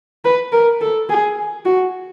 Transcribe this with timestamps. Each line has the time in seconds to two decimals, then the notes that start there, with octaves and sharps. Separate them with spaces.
0.25 B4
0.52 A#4
0.81 A4
1.09 G#4
1.65 F#4